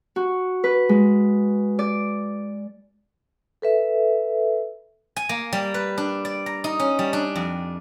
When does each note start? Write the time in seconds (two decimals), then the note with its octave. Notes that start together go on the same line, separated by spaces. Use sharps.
0.16 F#4
0.64 B4
0.89 G#3
1.79 D5
3.62 A4 B4 E5
5.16 G#5
5.29 A#3
5.53 G3
5.74 B4
5.98 D4
6.25 D5
6.46 A#5
6.64 D#4
6.80 C#4
6.99 G3
7.13 D4
7.36 F2